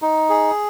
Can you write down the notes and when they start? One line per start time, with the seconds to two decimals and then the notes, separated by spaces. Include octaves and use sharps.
0.02 D#4
0.30 G#4